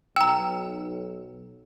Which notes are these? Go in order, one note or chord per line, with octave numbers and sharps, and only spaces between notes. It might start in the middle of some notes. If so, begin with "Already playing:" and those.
B1 G5 A#5 E6